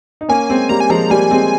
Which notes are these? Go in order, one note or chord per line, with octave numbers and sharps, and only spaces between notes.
D#4
A#3 C#4 G#5
G#3 C4
G3 A#3 A#5
G#5
F3 G#3 A#5
G3 A#3 G#5
G#3 C4